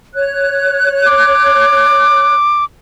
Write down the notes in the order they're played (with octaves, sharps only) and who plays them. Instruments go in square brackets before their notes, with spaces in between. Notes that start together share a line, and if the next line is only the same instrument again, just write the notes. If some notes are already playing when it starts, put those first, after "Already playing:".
[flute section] C#5 F#6
[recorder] D6